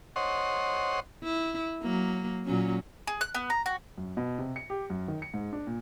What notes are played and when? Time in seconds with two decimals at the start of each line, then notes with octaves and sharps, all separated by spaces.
0.16 C5 C#5 D#5 F#5 C6
1.23 E4
1.82 F#3 A#3
2.45 A#2 F#3 C#4
3.07 G#4
3.21 F#6
3.35 B3
3.50 A#5
3.66 F#4
3.98 F#2
4.17 B2
4.39 C3
4.56 C#7
4.70 G4
4.90 F#2
5.08 D#3
5.22 C#7
5.34 G#2
5.53 D4
5.67 A#2